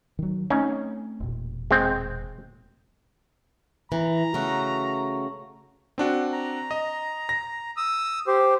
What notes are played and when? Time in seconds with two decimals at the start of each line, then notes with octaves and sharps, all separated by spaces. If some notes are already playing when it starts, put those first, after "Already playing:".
0.19 D#3 F#3
0.50 A3 C4 C#4 D#4
1.20 E1 A#2
1.71 G#3 C4 G5
3.92 E3 A#5
4.34 C#3 A3 F#4
5.98 C4 D4 F#4
6.32 A#5
6.71 D#5
7.29 A#6
7.77 D#6 E6
8.27 G4 C5